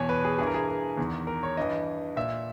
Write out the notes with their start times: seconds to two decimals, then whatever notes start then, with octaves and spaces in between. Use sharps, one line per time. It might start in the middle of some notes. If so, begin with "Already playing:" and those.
Already playing: E2 B2 C#5 G#5
0.09 B4
0.25 G#4
0.38 G2 E3 G#4
0.47 A#4
0.54 G#4
0.69 A#4
0.97 E2 D#3
1.27 A#4
1.43 C#5
1.57 G2 E3 D#5
2.16 A#2 E5